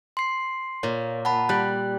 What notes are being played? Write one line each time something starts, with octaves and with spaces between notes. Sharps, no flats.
C6 C7
A#2 C#5
F#5 A5 B5
G3 F#6